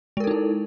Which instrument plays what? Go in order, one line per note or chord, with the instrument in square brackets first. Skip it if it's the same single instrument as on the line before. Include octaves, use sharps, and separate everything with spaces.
[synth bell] G#3
A#4
A4
D#4
E4